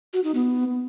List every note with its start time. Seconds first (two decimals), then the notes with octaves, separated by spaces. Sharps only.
0.13 F#4
0.24 D#4
0.34 B3